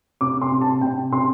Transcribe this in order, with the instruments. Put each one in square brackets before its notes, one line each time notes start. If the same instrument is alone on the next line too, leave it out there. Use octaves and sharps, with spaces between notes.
[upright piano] C3 D6
C6
C3
A5
C3 G5
C3 C6